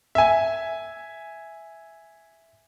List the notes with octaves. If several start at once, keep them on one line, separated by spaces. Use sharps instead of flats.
E5 G#5